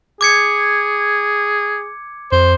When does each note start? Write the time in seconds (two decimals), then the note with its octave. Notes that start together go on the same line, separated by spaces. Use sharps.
0.21 G#4 D6 G#6 C#7
2.32 F2 C5